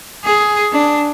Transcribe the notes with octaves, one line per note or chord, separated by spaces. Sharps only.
G#4
D4